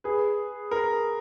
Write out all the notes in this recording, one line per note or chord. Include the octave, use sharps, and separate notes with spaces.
G#4 B4
A#4